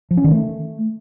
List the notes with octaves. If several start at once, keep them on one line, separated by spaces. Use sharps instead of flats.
F3
C#4
D#3
A3